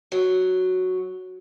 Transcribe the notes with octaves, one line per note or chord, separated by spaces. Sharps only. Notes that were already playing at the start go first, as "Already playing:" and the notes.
F#3